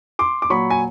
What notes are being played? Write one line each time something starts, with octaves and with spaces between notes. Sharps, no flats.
C6 D6
D6
A#2 F#3 B5 C#6
G#5